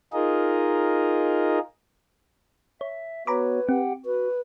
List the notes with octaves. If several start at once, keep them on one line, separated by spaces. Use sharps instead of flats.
D#4 F4 G#4 A#4 D#5
C#5 E5
B3 F#4 B4 C#5 A#5 B5 D6
C4 G4 F#5 G5
F#4 B4